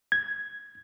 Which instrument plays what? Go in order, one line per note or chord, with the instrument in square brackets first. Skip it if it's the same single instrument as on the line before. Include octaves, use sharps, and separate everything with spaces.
[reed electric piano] G#6